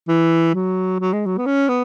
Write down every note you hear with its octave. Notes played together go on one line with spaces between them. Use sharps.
E3
F#3
F#3
G#3
F#3
B3
C#4
B3